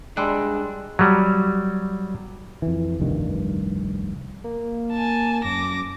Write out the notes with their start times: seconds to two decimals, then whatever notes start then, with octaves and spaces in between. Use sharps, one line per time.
0.17 G3 G#3 D4 C6 E6 F#6
0.99 F#3 G3
2.62 F2 E3
3.00 F1 C2 G2 D#3
4.44 A#3
4.93 G#5 A5
5.45 F#2 D6 A#6